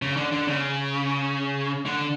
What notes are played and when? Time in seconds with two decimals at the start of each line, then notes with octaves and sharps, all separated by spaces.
0.02 C#3
0.17 D3
0.32 D3
0.47 C#3
1.86 D3